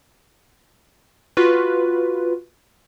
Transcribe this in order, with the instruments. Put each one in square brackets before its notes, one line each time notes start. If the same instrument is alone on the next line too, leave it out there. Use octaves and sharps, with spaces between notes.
[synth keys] F4 F#4 B4